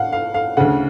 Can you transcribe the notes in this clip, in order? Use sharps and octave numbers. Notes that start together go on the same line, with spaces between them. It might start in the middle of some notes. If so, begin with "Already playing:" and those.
Already playing: F5 F#5
F5
F5
D2 C#3 F#5